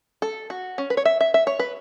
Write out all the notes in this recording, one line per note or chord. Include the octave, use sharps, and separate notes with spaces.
A4
F#4
C#4
B4
C#5
E5
E5
E5
C#5
B4